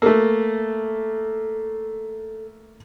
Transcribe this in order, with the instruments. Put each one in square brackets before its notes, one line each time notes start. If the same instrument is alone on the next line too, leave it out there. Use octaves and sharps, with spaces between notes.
[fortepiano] A3 A#3 [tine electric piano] A4